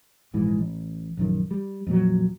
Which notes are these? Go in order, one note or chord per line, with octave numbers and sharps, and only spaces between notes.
A#1 G#2 E3
A1
A#1 F#2 D#3
G3
F2 A#2 F#3